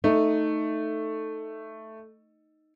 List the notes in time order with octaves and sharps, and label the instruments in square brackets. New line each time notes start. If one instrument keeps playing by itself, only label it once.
[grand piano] A3 [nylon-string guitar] D#4